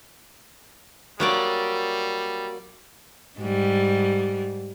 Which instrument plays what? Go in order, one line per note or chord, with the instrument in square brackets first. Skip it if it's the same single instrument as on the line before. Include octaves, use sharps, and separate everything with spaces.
[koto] F#3 A#3 D5 [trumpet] G3
[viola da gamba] G#2 G3